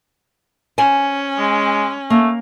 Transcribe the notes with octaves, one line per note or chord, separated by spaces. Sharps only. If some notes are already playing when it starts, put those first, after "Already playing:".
C#4 C5 G#5
G#3
A3 A#3